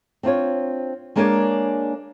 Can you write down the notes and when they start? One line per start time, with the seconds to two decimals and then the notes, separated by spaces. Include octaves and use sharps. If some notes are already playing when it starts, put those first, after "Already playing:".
0.23 C4 D4 F4 C#5
1.16 G#3 A#3 D4 A#4 C#5 G#5